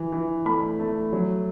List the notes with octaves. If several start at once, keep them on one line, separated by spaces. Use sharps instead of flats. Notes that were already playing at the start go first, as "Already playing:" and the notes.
Already playing: E3
E3
A3 B5
A3
F#3